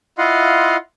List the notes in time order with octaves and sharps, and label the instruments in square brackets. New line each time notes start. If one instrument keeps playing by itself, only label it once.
[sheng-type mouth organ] E4 F4 D#5 F5 F#5 C6